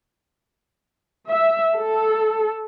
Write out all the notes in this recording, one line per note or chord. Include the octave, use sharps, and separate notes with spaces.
E5
A4